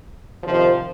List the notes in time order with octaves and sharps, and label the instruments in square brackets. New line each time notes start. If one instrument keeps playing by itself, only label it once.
[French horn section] C3 D#3 F3